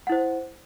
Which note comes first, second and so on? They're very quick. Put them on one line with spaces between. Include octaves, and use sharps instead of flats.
F#5 E4 C5